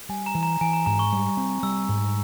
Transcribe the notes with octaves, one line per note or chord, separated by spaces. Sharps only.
G3 G#5
A#5
E3
A#5
E3 G#5
A#5
G#2 A#5
C#6
G3
C4
G3 E6
G#2